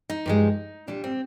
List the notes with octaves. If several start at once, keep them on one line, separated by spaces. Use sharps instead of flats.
D#4
G2 F3 G#3
A#2 G3 D4
C4